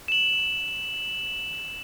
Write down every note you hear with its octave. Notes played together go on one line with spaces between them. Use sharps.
E7 F#7